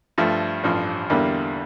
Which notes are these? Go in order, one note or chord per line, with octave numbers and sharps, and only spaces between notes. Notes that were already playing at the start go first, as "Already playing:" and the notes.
G2 F3 A3
A1 G2 F3
E2 D3 G3 A#3 E4